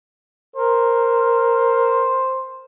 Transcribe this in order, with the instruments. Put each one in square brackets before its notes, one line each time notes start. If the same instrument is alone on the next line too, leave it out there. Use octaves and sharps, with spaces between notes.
[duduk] A#4 [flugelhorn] C5